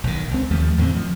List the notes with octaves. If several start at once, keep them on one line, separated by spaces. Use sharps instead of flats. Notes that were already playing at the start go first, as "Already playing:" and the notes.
B1 D#3
C#2 C4
D#2 F3 A3
E2 A2 D3 C4
F3